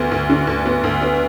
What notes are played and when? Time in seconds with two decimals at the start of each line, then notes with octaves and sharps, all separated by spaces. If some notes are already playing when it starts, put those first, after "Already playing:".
Already playing: D2 B3
0.11 D2
0.29 D3
0.47 D2
0.66 B3
0.84 D2
1.01 B3